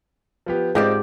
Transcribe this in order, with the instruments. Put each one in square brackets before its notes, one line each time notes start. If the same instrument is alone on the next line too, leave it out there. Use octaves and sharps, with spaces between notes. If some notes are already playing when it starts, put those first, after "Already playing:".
[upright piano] F3 B3 G4
[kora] G#2 G4 D5 [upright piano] C4 F4 D#5